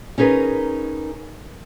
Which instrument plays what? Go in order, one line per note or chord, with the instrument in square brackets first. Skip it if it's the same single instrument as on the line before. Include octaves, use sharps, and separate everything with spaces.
[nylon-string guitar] C#4 D#4 G#4 A#4 B4